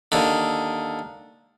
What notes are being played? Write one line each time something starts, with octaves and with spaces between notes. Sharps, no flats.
D#2 D3